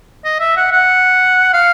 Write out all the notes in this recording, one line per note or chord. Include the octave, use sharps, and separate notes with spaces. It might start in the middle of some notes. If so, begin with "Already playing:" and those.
D#5
E5
F#5
F#5
F5